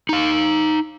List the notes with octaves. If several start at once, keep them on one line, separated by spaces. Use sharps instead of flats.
D#4 F5